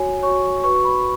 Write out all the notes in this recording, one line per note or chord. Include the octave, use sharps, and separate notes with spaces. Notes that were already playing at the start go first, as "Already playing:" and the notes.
Already playing: F#4 C#5 G#5
F#4 C#5 C#6
F#4 B4 C#6
C#6
B5